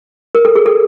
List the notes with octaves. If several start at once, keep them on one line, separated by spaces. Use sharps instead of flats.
A#4
A4
G#4
A4